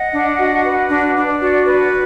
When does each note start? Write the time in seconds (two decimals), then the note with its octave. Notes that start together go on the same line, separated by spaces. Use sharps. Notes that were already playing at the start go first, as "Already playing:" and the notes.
Already playing: D#5 F#5
0.13 D4
0.38 F#4
0.64 B4
0.90 D4
1.15 D4
1.41 F#4 D5
1.65 B4 D5